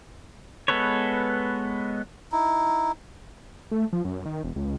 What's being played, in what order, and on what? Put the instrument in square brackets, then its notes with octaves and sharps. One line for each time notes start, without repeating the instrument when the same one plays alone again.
[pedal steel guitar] G#3 B3 A4 B4 C#5
[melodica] D#4 E4
[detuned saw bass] A3
F3
F#2
D#3
E1
C#2